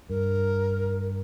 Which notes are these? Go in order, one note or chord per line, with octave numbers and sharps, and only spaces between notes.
G2 A#4